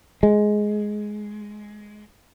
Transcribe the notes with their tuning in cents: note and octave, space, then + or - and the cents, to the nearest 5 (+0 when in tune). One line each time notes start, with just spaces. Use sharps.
G#3 +10